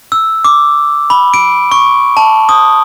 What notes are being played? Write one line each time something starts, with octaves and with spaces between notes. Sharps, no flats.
E6
D6
B5
D7
C#6
A5
D#6